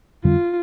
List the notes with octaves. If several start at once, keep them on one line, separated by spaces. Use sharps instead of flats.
F2 D3 G3 C4 F4